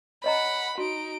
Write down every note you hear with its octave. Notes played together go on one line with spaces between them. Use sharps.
C#5 D#5 F#5 A#5 B5
D#4 F#4 D7